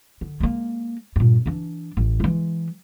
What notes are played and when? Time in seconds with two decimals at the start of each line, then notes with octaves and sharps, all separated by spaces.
0.21 D3
0.40 G#3 A#3
1.16 G2 A#2
1.46 E3 D4
1.97 A1
2.20 E3 G#3